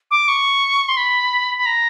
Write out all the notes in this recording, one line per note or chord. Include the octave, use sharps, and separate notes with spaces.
D6
C#6
C6
B5
B5
A#5